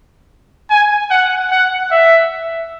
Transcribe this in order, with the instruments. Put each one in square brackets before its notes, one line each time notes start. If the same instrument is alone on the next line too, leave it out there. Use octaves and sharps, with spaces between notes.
[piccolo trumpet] G#5
F#5
F#5
E5